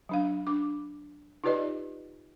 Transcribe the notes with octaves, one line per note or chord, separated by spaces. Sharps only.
F#3 D4 F5
D4 D6
D#4 F4 G4 B4 D5 D#5